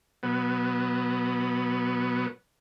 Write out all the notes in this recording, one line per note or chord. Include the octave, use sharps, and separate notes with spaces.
B2 F#3 B3